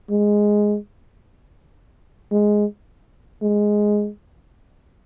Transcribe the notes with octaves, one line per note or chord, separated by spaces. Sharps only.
G#3
G#3
G#3